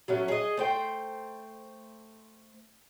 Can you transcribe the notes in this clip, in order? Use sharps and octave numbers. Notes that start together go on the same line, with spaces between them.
F#3 A3 C#4
G#4 D#5
A3 C5 G5